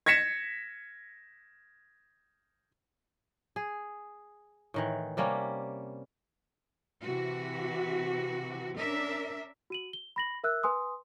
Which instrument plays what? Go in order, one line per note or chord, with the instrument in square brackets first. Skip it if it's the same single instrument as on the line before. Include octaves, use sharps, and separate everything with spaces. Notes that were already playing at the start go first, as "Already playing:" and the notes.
[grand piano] G#6 A#6 B6 C#7 E7
[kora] G#4
A2 D#3 E3
C3 G3 A#3 C#4
[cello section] C3 E3 F#4
C#4 D4 A#4 E5
[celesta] F#4 D#7 F#7
G7
B5 A#6 F#7
A#4 E5 E6 F#6
B4 G#5 C6 D#6